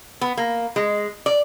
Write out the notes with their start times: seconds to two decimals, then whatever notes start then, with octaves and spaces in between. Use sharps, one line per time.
0.21 B3
0.37 A#3
0.76 G#3
1.26 D5